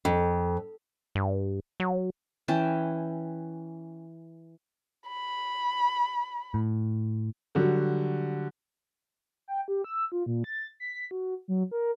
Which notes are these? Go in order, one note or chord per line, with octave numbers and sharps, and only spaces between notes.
F2
G2
F#3
E3 C#4 G5 A5
B5
A2
D3 F#3 G3 F#4
G5
G4
E6
F4
A#2
A6
B6
F#4
F#3
A#4